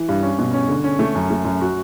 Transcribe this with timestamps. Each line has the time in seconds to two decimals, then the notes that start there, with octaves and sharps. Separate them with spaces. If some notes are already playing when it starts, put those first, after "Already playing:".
Already playing: E3
0.09 G2
0.23 C#4
0.39 B2
0.53 C#4
0.68 D3
0.84 C#4
0.99 A3
1.15 F#2
1.30 A3
1.45 F#2
1.61 F#4